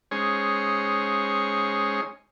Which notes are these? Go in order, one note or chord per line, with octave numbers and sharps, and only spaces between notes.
G#3 C#4 D#4 G#4 C5 C#5